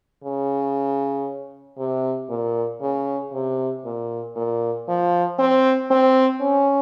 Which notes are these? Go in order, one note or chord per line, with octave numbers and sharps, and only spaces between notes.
C#3
C3
A#2
C#3
C3
A#2
A#2
F3
C4
C4
C#4